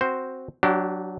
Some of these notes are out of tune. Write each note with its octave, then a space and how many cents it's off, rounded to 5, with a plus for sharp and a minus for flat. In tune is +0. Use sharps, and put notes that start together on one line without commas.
C4 +0 F#4 +0 C5 +0
F#3 +0 D4 +0 G4 -35